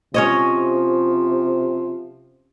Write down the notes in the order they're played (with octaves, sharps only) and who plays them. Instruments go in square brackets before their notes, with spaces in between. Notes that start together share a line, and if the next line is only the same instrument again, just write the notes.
[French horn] C3 [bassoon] F3 [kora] C#4 C#5 D#5